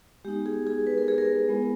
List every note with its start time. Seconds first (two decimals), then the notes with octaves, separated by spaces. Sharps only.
0.25 G#3 B3 D#4 G4
0.46 G#4
0.67 G#4
0.87 B4
0.98 A#4
1.08 G#4
1.18 A#4
1.49 G#3 B3 E4